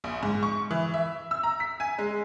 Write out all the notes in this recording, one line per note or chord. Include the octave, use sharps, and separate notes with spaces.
A#1
G#2
C#6
E3
E5
E6
A#5
B6
G#5
G#3